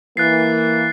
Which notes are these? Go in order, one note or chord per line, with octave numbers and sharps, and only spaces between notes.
E3 A#3 F#6 A6 C7